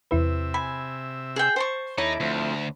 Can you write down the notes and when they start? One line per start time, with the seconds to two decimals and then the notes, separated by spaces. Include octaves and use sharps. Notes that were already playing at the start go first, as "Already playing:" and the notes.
0.11 E2 C3 E4 B4 E5
0.54 G#5 B5
1.36 G#4 G5
1.56 C5 A5 C#6
1.98 D#2 D#4 E4 A4 C#5 D6
2.20 D2 F3 A3 C4